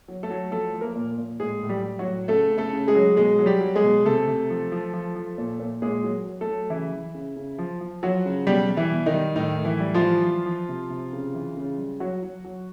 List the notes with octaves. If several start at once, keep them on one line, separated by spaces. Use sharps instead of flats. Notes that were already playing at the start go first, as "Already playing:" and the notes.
F#3
A3 A4
F#3
F3 A3 A4
F3
A#3 A#4
A#2
A#2
A2 G#3 G#4
A2
G3 G4
G3
F#3 F#4
A2
C#3 A3 A4
C#3
A3 A4
C#3
G#3 G#4
F#3
B2 G#3 G#4
F#3
G3 G4
F#3
G#3 G#4
B2
C3 A3 A4
C3
F3
F3
F3
F3
A#2
A#2
A#2 G#3 G#4
F#3
F#3
A3 A4
F#3
C#3 E3 E4
E3
C#3
C#3
F3
F3
F3 F#3 F#4
C#3
B2 G3 G4
G3
E3 E4
B2
D#3 D#4
G3
A2 D#3 D#4
A2
E3 E4
G3
F3 F4
E3
F3
F3
C3
C3
C#3
E3
C#3
G3
F#3 F#4
F#3
F#3